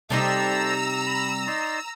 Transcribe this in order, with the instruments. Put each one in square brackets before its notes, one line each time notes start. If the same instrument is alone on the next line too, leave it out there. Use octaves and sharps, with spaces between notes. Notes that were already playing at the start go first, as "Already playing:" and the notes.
[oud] C3 G3 D#4 [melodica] A4 C5 D5 [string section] A#5 E6
[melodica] B5
D#4 D5 C6